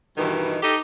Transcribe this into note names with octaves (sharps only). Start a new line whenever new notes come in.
G2 B2 D#3 E3
D#4 G4 A4